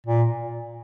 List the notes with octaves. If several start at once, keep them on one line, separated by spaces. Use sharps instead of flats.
A#2